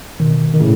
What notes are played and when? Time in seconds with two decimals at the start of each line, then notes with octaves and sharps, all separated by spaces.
0.20 B2 D#3
0.54 D#3
0.60 A2 C#3